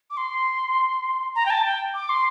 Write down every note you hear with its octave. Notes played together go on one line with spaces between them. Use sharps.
D6
C6
A#5
G5
A5
G5
D6
C6